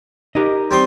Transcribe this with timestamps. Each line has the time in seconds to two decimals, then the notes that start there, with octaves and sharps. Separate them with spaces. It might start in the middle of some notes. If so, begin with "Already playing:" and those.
0.35 D#4 G4 A#4 D#5
0.71 G3 C4 C6 D#6